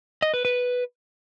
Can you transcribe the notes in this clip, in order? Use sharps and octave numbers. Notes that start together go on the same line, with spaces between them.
D#5
B4
B4